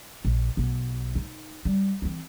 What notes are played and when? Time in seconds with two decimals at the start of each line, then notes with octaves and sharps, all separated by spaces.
0.25 A#1
0.57 B1 B3
1.15 D#4
1.65 G3
2.02 E3 C4